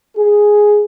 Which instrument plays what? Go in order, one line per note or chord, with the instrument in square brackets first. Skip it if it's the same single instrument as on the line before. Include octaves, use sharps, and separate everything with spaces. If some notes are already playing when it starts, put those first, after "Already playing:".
[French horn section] G#4